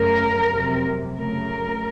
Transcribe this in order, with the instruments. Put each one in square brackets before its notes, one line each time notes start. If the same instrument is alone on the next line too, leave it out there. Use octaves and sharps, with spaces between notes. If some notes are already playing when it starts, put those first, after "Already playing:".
Already playing: [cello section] F#2 C#3 A3 A#4
F2 C3 F#3
F#2 C#3 A3 A#4